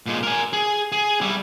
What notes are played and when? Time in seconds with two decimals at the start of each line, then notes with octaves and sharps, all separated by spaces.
0.06 A#2 G#3
0.23 A#4 G#5
0.53 G#4
0.92 G#4
1.21 G3 E4